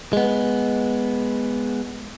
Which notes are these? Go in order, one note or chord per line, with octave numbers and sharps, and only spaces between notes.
G#3 B3